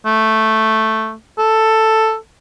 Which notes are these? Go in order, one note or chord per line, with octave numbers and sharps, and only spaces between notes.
A3
A4